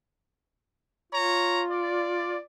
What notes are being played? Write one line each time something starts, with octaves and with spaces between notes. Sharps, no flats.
F4 C#5 A#5
D5